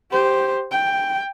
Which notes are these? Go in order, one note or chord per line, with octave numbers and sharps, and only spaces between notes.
G4 C5
G5